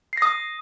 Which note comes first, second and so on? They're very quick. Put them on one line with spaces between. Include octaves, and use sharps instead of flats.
C7 A#6 D#6